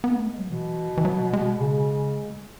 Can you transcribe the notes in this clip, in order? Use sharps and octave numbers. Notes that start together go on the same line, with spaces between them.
B3
A3
G#3
F#3
B2 E3
E3
F#3
G#3
C#3